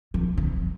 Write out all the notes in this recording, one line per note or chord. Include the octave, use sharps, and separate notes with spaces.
F3
D3